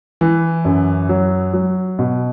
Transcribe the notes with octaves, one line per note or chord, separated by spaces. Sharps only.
E3
F#2
F#3
F#3
B2